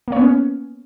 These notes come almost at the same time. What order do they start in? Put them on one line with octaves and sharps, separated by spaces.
A#3 C#5 B3 C#4